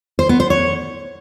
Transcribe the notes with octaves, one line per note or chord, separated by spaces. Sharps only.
C5
B3
C5
C#5